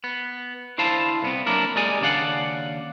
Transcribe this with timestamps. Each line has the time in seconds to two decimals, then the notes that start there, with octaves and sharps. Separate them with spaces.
0.04 B3
0.78 D3 E4 C5 F5 A5
1.22 C2 B3 C4
1.46 F#3 A#3 D4 E4 A#4
1.76 G#3 G4 G#4 D5 G#5
2.01 D#2 C#3 D4 D5 F5 F#5